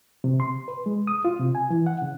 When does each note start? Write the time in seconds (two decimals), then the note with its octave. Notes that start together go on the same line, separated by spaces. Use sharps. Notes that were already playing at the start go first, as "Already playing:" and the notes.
0.24 C3
0.40 C6
0.68 B4
0.86 G#3
1.07 D#6
1.25 F4
1.40 C3
1.55 G#5
1.70 E3
1.86 F#5
2.02 C#3